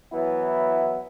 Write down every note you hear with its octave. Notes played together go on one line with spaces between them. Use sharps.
E3 F#3 B3 E4